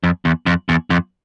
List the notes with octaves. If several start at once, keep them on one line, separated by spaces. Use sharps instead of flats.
F2
E2
F2
E2
F2